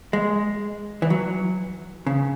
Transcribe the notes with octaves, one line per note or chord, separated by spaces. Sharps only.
G#3
E3
F#3
C#3